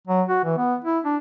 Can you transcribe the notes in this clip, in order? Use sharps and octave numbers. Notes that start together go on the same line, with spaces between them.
F#3
F#4
E3
B3
E4
D4